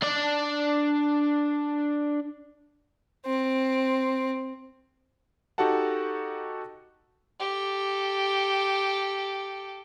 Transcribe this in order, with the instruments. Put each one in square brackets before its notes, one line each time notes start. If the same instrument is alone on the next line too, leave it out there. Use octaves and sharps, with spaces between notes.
[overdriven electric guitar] D4 D5
[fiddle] C4
[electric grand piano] D#4 F#4 G4 A4 F#5 A5
[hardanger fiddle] G4 A4